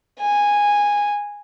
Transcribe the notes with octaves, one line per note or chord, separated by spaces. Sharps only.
G#5